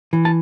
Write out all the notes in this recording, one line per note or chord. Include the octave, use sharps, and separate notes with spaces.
E3
A5